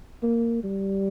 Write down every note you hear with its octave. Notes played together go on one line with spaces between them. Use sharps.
A#3
G3